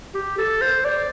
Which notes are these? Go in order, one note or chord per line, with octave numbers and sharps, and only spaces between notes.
G4
A4
C5
D5